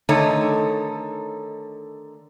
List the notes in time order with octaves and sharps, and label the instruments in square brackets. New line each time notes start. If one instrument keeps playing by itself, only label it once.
[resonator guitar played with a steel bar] D3 D#3 A3 D#4 A4 C#5